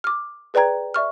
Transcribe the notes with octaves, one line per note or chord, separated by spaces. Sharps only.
D6 F6
G#4 B4 D5 G5 A#5 G#6
D5 E5 C#6 F6